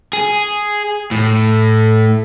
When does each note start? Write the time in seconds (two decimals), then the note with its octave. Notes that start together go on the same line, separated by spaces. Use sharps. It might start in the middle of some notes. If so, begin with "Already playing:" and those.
0.13 G#4
1.11 A2